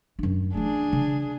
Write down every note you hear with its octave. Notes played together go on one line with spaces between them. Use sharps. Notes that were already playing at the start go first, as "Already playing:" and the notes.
F#2 D4
E3 A3 D4 G#4
C#3